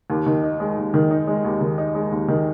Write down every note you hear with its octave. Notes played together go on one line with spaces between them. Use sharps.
D#2
D#3
D#4
G#3
D#2
D#3
D#4
G#3
D#2
D#3
D#4
G#3
D#2
D#3